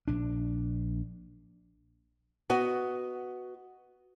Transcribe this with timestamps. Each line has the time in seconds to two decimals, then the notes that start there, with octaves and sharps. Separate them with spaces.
0.08 A#1 D4
2.50 B3 F#4 D#5